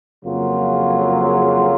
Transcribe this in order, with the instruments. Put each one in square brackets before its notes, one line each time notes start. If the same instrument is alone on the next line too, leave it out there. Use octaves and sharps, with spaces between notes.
[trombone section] F2 C#3 F#3 A#3 F4